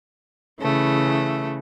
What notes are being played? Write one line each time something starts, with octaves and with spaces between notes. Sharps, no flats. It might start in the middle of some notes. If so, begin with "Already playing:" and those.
C#3 E3 A3